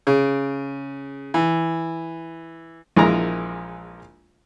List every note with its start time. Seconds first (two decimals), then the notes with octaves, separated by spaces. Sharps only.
0.07 C#3
1.34 E3
2.96 A#1 E3 G#3 A#4 A#5